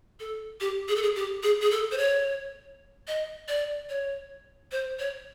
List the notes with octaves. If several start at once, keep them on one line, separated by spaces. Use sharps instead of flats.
A4
G4
G#4
A4
G#4
G4
G#4
G#4
A4
C5
C#5
D#5
D5
C#5
C5
C#5